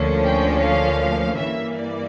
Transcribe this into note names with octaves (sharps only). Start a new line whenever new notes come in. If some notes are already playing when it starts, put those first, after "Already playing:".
Already playing: D2 D3 F3 A#3 C#4
G5
F5
G2 E3 A#3 E5
D5